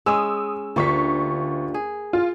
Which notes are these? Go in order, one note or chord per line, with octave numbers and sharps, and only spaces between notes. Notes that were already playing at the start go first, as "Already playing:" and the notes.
G#3 C#4 D#6 E6
D2 A#3 D4 F4 G4 C#6 B6
G#4
F4